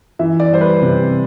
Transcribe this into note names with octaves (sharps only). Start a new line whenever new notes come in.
E3 E5
D5
G3 C5
B4
C3